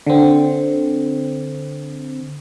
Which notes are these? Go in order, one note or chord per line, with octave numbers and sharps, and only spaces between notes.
D3 C4